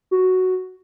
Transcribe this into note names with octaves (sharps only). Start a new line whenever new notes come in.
F#4